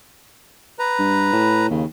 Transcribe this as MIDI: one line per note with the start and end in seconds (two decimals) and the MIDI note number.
0.79 1.67 71
0.79 1.67 82
0.99 1.33 43
1.33 1.65 45
1.70 1.85 39
1.70 1.85 49